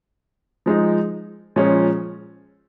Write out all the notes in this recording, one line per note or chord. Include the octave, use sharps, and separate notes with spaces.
F3 G#3 D#4
A#2 F3 G#3 C#4